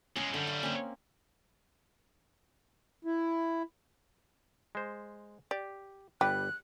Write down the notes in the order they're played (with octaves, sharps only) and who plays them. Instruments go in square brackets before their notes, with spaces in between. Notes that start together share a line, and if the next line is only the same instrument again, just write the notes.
[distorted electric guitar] E2 G#3 [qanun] C#4 G5
[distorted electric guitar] F#2 G3 [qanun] D3
[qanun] F5
A#3 C4 C#4
[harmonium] E4
[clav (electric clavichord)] G#3 C5
[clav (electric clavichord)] G4 [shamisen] D5
[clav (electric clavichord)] G1 G3 B4 [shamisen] G4 [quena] F#6